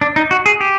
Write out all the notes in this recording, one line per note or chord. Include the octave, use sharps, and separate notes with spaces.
D4
D#4
F#4
G#4
G4